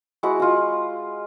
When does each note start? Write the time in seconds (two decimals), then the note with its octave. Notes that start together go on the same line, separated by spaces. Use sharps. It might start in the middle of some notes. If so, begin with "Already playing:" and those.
0.23 G#3 E4 F#4 F#5
0.40 F4 F#5